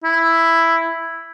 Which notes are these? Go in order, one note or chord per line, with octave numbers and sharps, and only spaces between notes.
E4